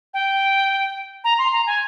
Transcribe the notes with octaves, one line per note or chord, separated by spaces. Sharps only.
G5
A#5
C6
A#5
G#5